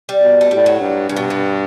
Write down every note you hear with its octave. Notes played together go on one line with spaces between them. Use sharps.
G3
B2
A3
A2 G3
F#3
G2
G2 C#3
B2
B2